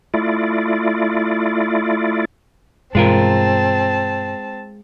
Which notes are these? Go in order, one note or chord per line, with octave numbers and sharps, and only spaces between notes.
A3 E4 F4 D5
G2 B2 E3 G#3 C4 F4 A#4 A5